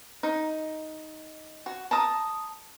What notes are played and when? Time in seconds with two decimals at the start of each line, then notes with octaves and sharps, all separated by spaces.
0.23 D#4
1.66 F#4
1.91 A5 A#5 D#6